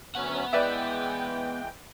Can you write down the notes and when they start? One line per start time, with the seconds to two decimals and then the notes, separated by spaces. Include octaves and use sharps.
0.15 D2 F#3 B3 C#4 F#5
0.53 E3 G#3 B4 D5 E5 G5